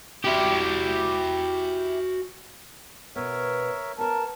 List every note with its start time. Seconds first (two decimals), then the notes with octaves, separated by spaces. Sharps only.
0.25 E4 F#4 G4 E5
3.16 B2 B3 A#4 C#5 E5
3.98 B3 A#4 C#5 A5